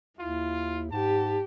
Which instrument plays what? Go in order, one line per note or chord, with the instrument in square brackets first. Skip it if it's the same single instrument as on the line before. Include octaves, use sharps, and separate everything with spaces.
[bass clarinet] D#2 [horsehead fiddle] E4 [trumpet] F4
[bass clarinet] G#2 [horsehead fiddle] G4 [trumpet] A5